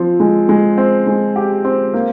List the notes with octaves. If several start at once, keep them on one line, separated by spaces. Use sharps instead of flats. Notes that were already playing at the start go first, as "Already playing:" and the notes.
Already playing: F3 C4
G#3
G#3
C4
G#3
G4
C4
A#3